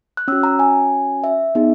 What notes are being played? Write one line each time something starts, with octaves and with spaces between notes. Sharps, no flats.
F#6
C#4 F#4 E6
A#5
G#5
E5
B3 D#4 G#4